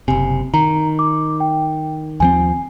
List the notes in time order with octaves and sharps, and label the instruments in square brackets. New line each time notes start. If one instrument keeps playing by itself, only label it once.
[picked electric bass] F#1 C3 [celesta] G#5
[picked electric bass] D#3 [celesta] A#5
[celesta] D6
G5
[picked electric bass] D#2 F3 C4 [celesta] G#5